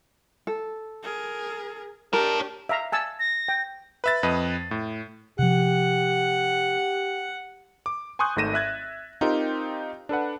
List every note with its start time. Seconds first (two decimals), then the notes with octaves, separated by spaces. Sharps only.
0.47 A4
1.03 G#4 A#4
2.13 D4 G4 A#4 C#5 A5
2.69 E5 F5 A#5
2.92 G#5 A5 E6
3.19 A#6
3.48 G5
4.04 B4 E5 A6
4.23 F2 B4 D#5 D#7
4.71 A2
5.39 C3 F3 G4 F#5
7.86 D6
8.19 G#5 C6 C#6 D#6 F#6 G6
8.36 G#1 G#2 A3 A#6 D#7 E7
8.54 E5 F#6 G#6 A6
9.21 C4 D#4 F4 G4 A#4 C5
10.09 D4 A4 B4 F#5